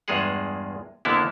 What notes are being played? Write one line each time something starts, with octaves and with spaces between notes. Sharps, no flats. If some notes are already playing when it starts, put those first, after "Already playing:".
E2 G2 G#3 F4 G#4 F#5
F2 D3 A#3 B3 E4